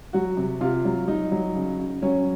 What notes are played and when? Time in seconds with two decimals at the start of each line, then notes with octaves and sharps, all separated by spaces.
0.13 F#3 F#4
0.37 C3
0.61 C3 F4
0.85 F#3
1.08 F#3 D#4
1.32 F#3
1.56 C#3
1.78 C#3
2.02 F#3 C#4